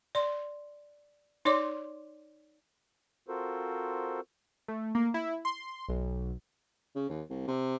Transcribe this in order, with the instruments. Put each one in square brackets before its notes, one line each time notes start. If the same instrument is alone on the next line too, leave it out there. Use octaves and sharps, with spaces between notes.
[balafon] D5 C6
D#4 C#5 D5 C6 D6
[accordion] C4 F4 F#4 A4 A#4 C5
[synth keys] A3
A#3
E4
C6
B1
[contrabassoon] C#3
D#2
C2
C3